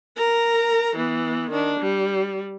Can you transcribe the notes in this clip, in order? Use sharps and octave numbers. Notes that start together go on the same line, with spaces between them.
A#4 A#5
E3 B3
D#3 D4
G3